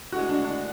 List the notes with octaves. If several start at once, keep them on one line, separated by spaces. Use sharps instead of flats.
D2 D3 G#3 F#4
D4
D4